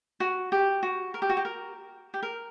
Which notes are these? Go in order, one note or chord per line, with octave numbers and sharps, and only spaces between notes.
F#4
G4
F#4
A#4
G4
F#4
G4
A#4
G4
A#4